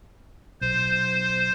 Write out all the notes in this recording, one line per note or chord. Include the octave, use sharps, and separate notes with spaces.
B1 C5